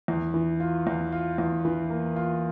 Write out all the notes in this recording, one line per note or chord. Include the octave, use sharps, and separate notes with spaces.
E2
E3
F4
E2
F4
E2
E3
A#3
F4